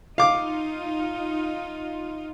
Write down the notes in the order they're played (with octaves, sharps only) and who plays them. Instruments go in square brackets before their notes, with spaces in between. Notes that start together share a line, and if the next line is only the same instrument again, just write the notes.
[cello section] D#4 F4 [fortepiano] F5 D6